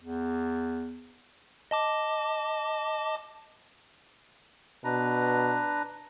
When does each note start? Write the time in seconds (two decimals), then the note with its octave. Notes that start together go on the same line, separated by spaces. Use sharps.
0.01 E2
1.71 D#5 A5 D6
4.84 B2 D4 B4 A#5